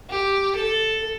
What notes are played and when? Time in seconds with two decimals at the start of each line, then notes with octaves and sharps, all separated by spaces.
0.10 G4
0.55 A4